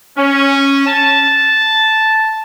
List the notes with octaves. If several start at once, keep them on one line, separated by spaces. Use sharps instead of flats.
C#4
A5